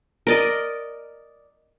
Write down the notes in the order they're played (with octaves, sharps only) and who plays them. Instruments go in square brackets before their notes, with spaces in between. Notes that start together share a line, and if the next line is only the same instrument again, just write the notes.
[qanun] A#4 D5 D#5